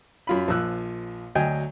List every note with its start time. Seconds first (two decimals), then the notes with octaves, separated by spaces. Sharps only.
0.27 F#2 F4 B5
0.48 A#1 F3 E6 F#6
1.35 D2 F#3 D#5 G5 G#5